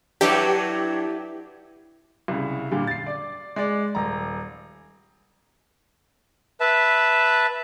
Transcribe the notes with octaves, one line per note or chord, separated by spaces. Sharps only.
F#3 D4 E4 G4 A4 B4
C2 C#3
A#2 D3 G3
A6 C7
D5
G#3 D5
D#1 A#5
B4 E5 A5